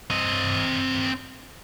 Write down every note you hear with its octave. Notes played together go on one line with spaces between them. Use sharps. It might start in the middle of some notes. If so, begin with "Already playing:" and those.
C4 D#5